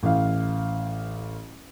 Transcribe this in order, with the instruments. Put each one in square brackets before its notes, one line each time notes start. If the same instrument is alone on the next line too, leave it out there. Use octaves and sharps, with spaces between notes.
[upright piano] A1 F5